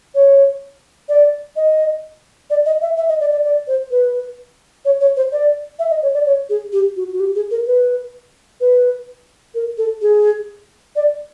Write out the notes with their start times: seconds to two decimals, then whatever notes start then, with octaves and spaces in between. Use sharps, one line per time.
0.15 C#5
1.09 D5
1.56 D#5
2.50 D5
2.66 D#5
2.82 E5
2.97 E5
3.09 D#5
3.20 D5
3.32 D5
3.44 D5
3.68 C5
3.91 B4
4.85 C#5
5.01 C#5
5.17 C5
5.32 D5
5.79 E5
5.90 D#5
6.02 C#5
6.14 D5
6.26 C#5
6.50 G#4
6.73 G4
6.96 F#4
7.13 F#4
7.20 G4
7.35 G#4
7.51 A#4
7.67 B4
8.61 B4
9.55 A#4
9.78 A4
10.02 G#4
10.96 D5